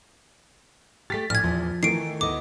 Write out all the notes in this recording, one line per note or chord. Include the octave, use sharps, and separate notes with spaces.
A3 G4 A6 B6
A#1 A2 F6 G#6
E2 F3
D#3 E3 A3 C7 D7
D2 B3 D#5 D6